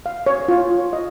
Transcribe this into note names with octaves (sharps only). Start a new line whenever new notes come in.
F5
C#5
F4
D#5